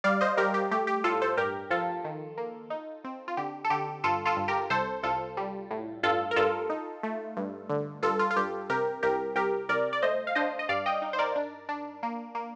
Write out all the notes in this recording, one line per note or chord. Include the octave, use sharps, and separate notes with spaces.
G3 D5 F5
C5 D#5
G3 G4 A#4
G4
A3 G4
G4
A2 F4 A4
A4 C5
G2 G4 A#4
F3 F4 A4
D#3
A#3
D#4
C4
F4
D3 G4
A4
D3 G4
G2 F4 A4
F4 A4
G2
G4 A#4
C2 A4 C5
C2 F4 A4
G3
A2
G2 F4 A4
A#4
G2 F4 A4
D#4
A3
G2
D3
G2 F4 A4
F4
F4
G2 G4
C3 G4 A#4
C2 G4 A#4
C2 G4 A#4
C2 A#4 D5
D5
A3 C5 D#5
F5
D4 C5 D#5
D#5
G2 D5 F5
D#5 G5
D#4
C5
A#4 D5
D4
D4
A#3
A#3